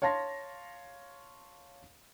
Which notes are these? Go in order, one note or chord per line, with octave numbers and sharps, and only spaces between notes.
C#5 F5 A5 C6 A#6